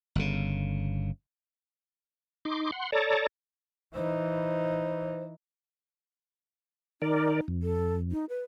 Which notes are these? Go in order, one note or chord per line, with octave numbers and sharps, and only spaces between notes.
G1 C#3
D#4 C6 D6
F#5 C6
A4 C#5 D5 A5 A#5
E3 D#4 C5
D#3 D#4 A#4 D5
F2
A4
D#4
B4